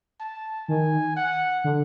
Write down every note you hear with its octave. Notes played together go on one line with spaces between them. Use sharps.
A5
D#3 G#5
F#5
D3